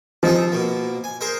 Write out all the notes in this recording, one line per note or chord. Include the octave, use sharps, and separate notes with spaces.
F3 D#4 G#4 A4
B2 A#3
G#5
G#4 A#4 C5